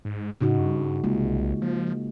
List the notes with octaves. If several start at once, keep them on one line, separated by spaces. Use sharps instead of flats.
G#2
A2 C#3 D#4 F#4
G2
C2 G#3 A#3 F4
F3 A#3